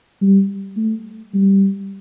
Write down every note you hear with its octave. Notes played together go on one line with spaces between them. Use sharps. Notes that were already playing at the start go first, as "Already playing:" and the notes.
G3
A3
G3